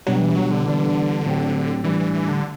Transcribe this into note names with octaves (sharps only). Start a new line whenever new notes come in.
B2 F#3 G3 B3 D4 G4
E3
F#3
D3
E3 G3 B3 D4
A2 F#3 C4 E4 G4
A2 E3 G3 D4
E3
E3
D3